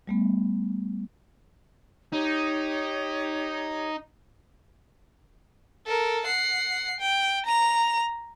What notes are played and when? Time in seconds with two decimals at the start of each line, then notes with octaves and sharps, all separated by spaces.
0.07 G3 A3 B3
2.13 D#4 G4 C#5
5.86 A4 A#4
6.26 F#5 C7
7.00 G5
7.46 A#5 F7